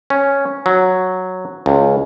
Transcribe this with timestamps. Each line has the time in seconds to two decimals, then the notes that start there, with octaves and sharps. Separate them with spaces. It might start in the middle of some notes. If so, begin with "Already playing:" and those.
0.10 C#4
0.66 F#3
1.66 C#2